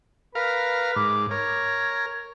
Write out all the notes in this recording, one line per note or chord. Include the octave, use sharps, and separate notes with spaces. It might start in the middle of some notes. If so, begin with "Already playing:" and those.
A#4 B4 F5
G#2 D6
A#4 C#5